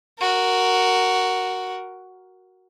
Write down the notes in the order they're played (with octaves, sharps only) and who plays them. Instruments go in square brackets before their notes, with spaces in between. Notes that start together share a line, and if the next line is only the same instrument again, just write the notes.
[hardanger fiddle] F#4 A#4